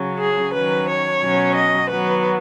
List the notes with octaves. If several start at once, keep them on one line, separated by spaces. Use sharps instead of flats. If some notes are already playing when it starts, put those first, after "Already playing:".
Already playing: C#3 F#3 C#4
G#4
D#3 F#3 C#4 B4
C#5
B2 F#3 C#4
D#5
D#3 F#3 B3 B4